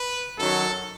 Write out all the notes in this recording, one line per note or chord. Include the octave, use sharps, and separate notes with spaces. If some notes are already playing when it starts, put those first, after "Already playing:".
Already playing: B4
F#2 D#3 F#3 A4